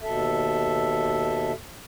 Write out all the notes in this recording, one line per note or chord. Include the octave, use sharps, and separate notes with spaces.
D#2 B2 A4 E5